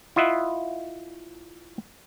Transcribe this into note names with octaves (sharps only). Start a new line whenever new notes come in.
E4 F4 D#5 E5 F#5